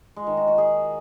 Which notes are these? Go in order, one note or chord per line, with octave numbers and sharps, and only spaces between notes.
G#3
D#3
F#4
F#4
G#4